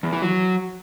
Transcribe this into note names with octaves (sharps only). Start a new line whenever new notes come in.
E2
E3
F#3